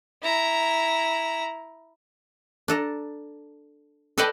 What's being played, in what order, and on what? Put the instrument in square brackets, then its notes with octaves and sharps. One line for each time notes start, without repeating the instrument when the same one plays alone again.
[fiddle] E4 A#5
[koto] D4 A4 A#5
A4 B4 D5 D#5 G5 A5